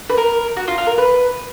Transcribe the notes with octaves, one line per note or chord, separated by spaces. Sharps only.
B4
A#4
F#4
F4
F4
A#4
B4